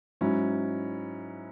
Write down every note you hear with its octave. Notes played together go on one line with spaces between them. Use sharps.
G#2 F#3 C#4 E4